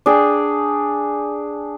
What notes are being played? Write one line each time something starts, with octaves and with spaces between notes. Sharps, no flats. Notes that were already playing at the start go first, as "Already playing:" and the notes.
D4 G#4 G5